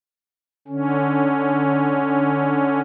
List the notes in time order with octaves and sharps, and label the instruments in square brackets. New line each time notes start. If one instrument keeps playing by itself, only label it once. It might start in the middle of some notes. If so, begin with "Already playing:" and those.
[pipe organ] D3 C#4